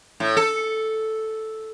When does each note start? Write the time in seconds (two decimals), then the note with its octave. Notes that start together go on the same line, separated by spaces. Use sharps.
0.20 A2
0.37 A4